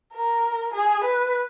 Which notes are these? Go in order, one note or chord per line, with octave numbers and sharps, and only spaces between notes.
A#4
G#4
B4